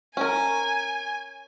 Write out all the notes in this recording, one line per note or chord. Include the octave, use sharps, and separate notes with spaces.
C#4 A#4 G#5